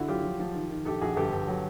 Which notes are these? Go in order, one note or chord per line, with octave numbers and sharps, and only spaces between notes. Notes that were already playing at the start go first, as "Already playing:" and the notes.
Already playing: D3 E4 F#4
F#3 F4 G4
F3
F3
D#3
D#3
A#1 G4 A4
A#1 F#4 G#4
G1 G4 A4
G1
F#3